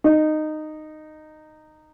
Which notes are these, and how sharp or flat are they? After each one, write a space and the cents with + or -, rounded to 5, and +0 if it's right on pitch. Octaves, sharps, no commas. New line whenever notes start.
D#4 -15